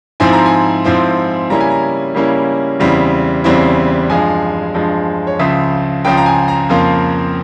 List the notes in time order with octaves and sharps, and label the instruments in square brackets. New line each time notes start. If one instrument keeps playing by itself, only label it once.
[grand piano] G#2 F3 C4 E4 G#5
A#5
G#5
G#2 F3 C4 E4
C#3 G3 A#3 C#4 E4 A#5
G#5
A#5
C#3 G3 A#3 C#4 E4
E2 C#3 G3 C4 E4
E2 C#3 G3 C4 E4
G2 F3 G#3 G#5
G2 F3 G#3
C#5
C#2 C#3 F3 E5
C#2 C#3 F3 G5
A#5
G#5
A#5
F2 C#3 F3 A#3 F4